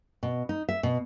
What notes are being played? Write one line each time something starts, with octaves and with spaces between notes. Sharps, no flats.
B2
D#4
E5
B2